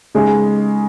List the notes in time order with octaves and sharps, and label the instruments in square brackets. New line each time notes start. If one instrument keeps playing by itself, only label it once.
[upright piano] C#3 G#3 D#4 G#4 D#5